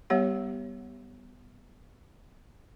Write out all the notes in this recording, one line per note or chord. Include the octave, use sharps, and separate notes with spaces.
G3 B3 G4 C#5 F#5